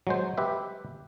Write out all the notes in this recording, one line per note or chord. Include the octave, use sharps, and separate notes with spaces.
F#3 G#3 C5
G4 B4 E5